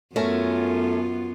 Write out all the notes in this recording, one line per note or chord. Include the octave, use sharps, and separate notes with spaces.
F#2 A3 B3 C#4 F4 A#4